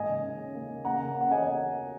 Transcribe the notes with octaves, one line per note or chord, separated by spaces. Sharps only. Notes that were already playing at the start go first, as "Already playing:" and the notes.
Already playing: G#2 A#3 D#5 G#5
C#3
C#3
C#4
A#3
C#3
A#3 F#5 A#5
C#3
C#3
F#5
C#4 D#5 G#5